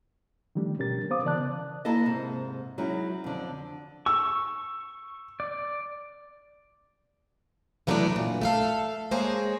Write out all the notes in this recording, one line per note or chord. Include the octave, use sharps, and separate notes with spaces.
D#3 F3 G3 A3 D4
G#2 B2 C#4 G4 A#4 A6
B3 A#4 C5 F5 D6 D#6
C#3 E3 D5 A5 F#6
A#3 E4 A4 D#5
G#2 C3
F#3 G#3 C#4 D#4 E4
F2 D3
C#6 E6
D5
E3 F#3 G3 A3 B3 D4
A#2
A3 A4 F5
G#3 A#3 G#4 C5 C#5 D#5